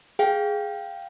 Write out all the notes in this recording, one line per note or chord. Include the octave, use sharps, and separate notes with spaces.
G#4 F5 G5